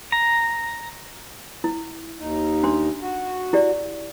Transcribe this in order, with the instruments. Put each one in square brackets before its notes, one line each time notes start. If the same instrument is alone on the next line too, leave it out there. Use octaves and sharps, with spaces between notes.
[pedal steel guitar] A#5
[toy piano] E4
[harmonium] D#2 D#4
[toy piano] D4 C6
[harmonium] F#4
[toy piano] E4 G4 D5